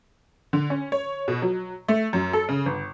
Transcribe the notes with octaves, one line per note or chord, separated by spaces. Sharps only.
D3
C#4
C#5
B2
F#3
A3
F#2
A4
C#3
G1